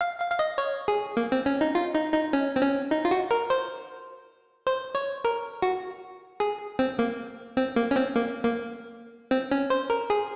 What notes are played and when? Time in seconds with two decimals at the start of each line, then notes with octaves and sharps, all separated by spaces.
0.01 F5
0.20 F5
0.31 F5
0.39 D#5
0.58 C#5
0.88 G#4
1.17 A#3
1.32 C4
1.46 C#4
1.61 D#4
1.75 F4
1.95 D#4
2.14 D#4
2.33 C#4
2.56 C4
2.62 C#4
2.91 D#4
3.05 F4
3.11 F#4
3.31 A#4
3.50 C5
4.67 C5
4.95 C#5
5.25 A#4
5.62 F#4
6.40 G#4
6.79 C4
6.99 A#3
7.57 C4
7.76 A#3
7.91 C#4
7.96 C4
8.16 A#3
8.45 A#3
9.31 C4
9.51 C#4
9.70 C5
9.90 A#4
10.10 G#4